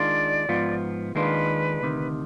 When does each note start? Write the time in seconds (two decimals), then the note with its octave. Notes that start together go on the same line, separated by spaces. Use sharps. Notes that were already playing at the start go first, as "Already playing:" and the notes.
Already playing: D#3 G#3 D4 F4 D5
0.49 G#2 F3 B3 F4
1.15 D#2 D#3 G#3 D4 F4 B4
1.82 D2 C3 D#3